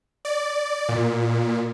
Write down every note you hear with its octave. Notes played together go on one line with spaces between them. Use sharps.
D5
A#2